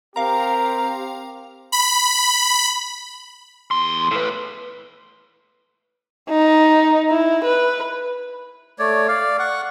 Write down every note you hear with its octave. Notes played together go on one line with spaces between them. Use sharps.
C4 G4 A#4 F5 A#5
B5
E2 C6
A2 B4
D#4
E4
B4
A3 C#5 D5
D5 F5
F#5 C#6